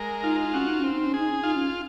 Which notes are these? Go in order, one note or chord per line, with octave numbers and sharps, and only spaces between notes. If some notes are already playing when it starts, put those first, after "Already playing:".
Already playing: G#3 A#4
D#4 F4
C#4 F#4
D#4
C4 C#4
D#4
C#4
D#4 G#4
C#4
D#4 F4
C#4